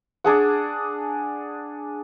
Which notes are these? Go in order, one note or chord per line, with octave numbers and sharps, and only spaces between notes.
D4 G#4 F#5